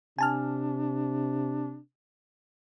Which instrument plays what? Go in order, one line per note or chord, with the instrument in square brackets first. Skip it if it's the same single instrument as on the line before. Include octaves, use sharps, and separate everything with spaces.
[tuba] C3 [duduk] D4 [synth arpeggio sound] G#5 A5 F6